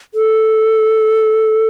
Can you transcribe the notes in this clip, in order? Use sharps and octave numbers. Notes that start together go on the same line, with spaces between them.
A4